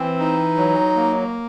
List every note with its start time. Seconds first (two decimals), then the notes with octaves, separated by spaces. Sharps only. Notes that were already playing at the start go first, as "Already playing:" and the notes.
Already playing: E3 C4
0.19 D#4
0.57 F#3
0.95 A#3